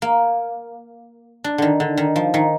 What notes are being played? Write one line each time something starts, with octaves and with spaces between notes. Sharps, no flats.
A#3
D4
D3 D#3
D3
D#3
F3
D#3